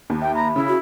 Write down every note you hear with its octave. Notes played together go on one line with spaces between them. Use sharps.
D#2
E5 G5
A#5 B5
C#3 E4
F#4